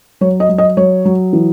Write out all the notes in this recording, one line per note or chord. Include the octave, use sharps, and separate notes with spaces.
F#3 C#5
D#5
F#3
D#5
F#3 C#5
F#3
E3